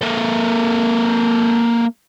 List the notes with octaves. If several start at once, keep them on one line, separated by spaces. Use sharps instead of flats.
A#3 A4